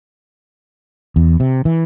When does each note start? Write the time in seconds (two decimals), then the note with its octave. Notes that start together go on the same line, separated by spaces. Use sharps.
1.16 E2
1.40 C3
1.65 E3